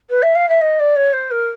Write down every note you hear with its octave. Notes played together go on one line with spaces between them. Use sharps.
B4
E5
F5
E5
D#5
D5
C#5
C5
A#4